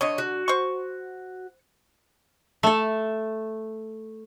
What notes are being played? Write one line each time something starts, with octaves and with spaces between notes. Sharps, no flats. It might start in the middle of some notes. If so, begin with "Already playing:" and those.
D3 C#5 D#5
F#4
C5 C#6
A3 A4